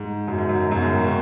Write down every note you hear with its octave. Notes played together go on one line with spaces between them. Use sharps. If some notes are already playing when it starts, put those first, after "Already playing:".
Already playing: G#2
F#2
G#2
F#2
G#2
F#2 B2
G#2 C#3
D#3
B2